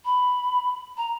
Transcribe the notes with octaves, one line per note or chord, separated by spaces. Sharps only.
B5
A#5